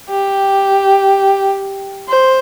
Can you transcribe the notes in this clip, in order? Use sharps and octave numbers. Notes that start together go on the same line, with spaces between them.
G4
C5